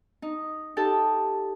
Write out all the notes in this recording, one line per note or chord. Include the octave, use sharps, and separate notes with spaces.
D#4
D#4 G4 A4 A5